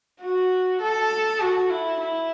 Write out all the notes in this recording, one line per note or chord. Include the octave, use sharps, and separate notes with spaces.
F#4
A4
F#4
E4
E4